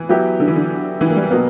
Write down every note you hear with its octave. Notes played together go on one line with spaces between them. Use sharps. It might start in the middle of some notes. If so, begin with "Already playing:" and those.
Already playing: E3
F#3 B3 E4 G4
D3
E3
D3
E3
A#3
G3
B2 F#3 A#3 B3